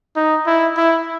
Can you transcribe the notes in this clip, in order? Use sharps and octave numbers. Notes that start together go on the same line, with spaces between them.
D#4
E4
E4